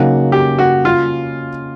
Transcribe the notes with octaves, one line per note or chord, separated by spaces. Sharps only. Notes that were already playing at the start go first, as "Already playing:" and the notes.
Already playing: C#3 F#3 A#3 D#4 F#4
G4
F#4
F4